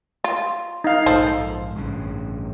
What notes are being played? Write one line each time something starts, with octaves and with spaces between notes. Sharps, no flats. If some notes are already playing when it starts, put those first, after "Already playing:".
F4
D#4 F5
A#1 G#2 F3 A4 C5
A1 G2 C#3